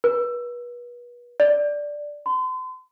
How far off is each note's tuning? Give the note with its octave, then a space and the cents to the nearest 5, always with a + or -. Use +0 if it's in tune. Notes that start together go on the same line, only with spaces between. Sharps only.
B4 -35
D5 -5
C6 -40